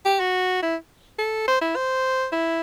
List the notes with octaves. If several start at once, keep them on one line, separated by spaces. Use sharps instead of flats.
G4
F#4
E4
A4
C5
E4
C5
E4